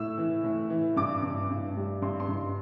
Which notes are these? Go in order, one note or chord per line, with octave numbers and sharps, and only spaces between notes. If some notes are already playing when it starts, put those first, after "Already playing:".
Already playing: A2 E6
E3
A2
E3
G2 D6
G2
G2
G3
G2 C6
C6
G2